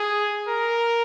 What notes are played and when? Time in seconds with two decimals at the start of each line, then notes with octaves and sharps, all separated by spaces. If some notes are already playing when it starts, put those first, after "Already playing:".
Already playing: G#4
0.48 A#4